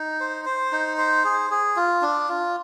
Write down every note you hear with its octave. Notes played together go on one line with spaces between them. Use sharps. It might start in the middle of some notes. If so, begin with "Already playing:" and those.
Already playing: D#4
C5
C5
D#4
C5
G#4
G#4
F4
D4
F4